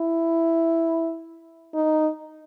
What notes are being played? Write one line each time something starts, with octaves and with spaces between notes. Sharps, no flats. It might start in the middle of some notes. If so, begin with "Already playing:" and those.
Already playing: E4
D#4